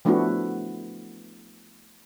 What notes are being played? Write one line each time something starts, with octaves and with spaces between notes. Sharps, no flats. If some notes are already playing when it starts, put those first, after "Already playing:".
F3 A3 B3 D4 E4 F#4